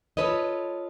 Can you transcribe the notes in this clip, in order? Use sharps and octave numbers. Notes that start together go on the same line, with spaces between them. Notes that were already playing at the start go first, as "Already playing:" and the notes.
F4 F#4 A4 B4 C#5 D#5